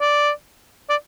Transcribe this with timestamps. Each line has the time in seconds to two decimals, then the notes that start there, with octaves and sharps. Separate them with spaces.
0.01 D5
0.90 D5